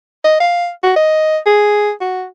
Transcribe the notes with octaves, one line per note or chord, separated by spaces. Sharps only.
D#5
F5
F#4
D#5
G#4
F#4